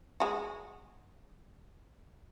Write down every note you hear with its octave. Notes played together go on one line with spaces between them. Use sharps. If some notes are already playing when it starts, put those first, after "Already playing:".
G#3 F#4